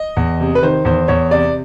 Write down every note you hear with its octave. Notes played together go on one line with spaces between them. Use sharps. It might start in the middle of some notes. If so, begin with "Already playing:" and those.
Already playing: D#5
E2
C3
B4
D#3 C5
E2 C5
E2 C#5
C3 D5